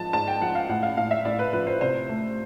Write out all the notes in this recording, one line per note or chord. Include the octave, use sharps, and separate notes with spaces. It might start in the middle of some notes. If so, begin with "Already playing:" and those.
Already playing: G#2 F3 A5
G#2 A5
G5
F3 F#5
F5
A2 F#5
F5
A2 F5
E5
A2 D5
B4
F3 B4
C5
C3 C5
A3